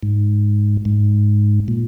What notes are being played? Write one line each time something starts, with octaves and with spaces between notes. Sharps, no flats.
G#2
G#2
A#2